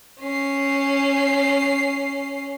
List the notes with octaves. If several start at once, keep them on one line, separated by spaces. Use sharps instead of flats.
C#4 C7